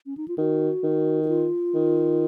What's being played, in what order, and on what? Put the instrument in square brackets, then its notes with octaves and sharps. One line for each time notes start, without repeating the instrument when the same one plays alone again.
[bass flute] C#4
D#4
F4
[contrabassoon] D#3 [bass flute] F#4
[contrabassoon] D#3
[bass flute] F#4
F4
[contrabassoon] D#3